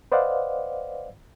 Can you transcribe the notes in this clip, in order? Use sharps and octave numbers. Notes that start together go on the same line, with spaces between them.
B4 C5 D5 D#5 F5 F#5